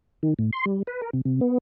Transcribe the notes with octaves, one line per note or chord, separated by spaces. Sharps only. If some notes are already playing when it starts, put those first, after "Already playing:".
D#3
A2
C6
G3
B4
A#4
C3
C3
B3